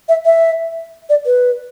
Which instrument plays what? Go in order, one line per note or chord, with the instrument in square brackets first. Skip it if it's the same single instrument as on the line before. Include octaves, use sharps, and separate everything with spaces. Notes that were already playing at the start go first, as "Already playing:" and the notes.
[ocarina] E5
E5
D5
B4